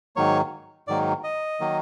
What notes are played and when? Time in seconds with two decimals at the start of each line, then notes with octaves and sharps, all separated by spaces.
0.16 G#2 D#3 F#3 A#3 C#5
0.88 G#2 D#3 F#3 A#3 D5
1.24 D#5
1.60 D#3 F#3 A#3